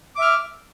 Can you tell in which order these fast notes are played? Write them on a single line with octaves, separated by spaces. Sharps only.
D6 E5 F6